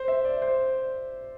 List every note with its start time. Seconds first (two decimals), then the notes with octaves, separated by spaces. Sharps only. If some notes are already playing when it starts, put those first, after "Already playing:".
Already playing: C5
0.08 E5
0.25 D5
0.42 C5